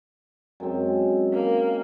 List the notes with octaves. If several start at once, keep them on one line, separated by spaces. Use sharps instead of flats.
F#2 G#3 C4
A#3 F5